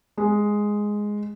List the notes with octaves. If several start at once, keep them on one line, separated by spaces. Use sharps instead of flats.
G#3